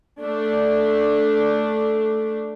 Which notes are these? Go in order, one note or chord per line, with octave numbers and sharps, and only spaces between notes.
A3 D4